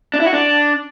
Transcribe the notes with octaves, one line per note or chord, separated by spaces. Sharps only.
D4
E4
F#4
D4